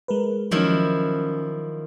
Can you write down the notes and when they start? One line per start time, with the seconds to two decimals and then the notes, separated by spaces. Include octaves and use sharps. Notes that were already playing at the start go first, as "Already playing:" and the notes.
0.08 G#3 A#4 B4
0.51 D#3 F3 F#3 C#4 E4